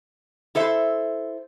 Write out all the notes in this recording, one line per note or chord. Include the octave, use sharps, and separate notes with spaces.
E4 A4 C5 E5